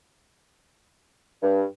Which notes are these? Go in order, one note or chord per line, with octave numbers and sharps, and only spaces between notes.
G2